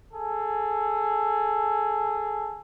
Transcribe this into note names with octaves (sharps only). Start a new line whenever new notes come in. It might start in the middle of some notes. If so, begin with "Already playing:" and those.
G#4 A4